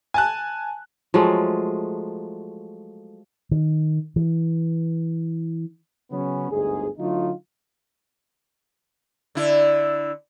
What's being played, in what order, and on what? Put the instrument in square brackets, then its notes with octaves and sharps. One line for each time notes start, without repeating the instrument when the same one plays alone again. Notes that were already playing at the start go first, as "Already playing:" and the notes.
[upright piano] G#5 A5 F#6
[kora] F3 F#3 G#3 A3
[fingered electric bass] D#3
E3
[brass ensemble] C#3 F#3 B3 C#4
G1 D2 G#2 G#4
D3 F#3 A3 D#4 F4
[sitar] D3 E4